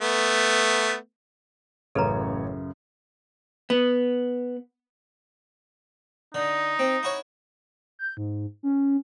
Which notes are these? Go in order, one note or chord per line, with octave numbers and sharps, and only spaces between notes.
A3 B3
A1 F#2 C#3 A4 B4 C#5 A#5
B3
D3 D#4
C4
E4 F#4 C#5
G6
G#2
C#4